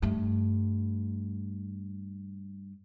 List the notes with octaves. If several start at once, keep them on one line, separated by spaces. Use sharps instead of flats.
G2 A3